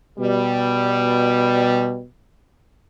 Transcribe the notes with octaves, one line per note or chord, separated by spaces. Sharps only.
B2 G3